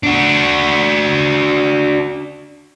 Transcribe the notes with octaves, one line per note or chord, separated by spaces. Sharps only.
D4 F#4